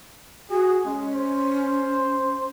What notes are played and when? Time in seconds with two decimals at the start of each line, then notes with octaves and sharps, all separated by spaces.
0.50 F#4 G#4
0.85 G#3 C#4
1.15 C5